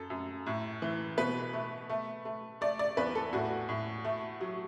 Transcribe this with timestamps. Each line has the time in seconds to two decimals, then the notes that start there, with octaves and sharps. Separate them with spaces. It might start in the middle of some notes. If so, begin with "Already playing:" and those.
Already playing: F#2 A4
0.10 F#2
0.46 A2
0.82 E3
1.18 B2 B4
1.53 A3
1.89 A3
2.25 A3
2.61 A3 D5
2.79 D5
2.97 E2 B4
3.15 A4
3.33 A2 F#4
3.69 A2
4.05 A3
4.41 F#3